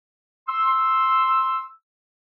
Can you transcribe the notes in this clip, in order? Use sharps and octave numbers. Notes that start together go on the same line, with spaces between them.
C6 E6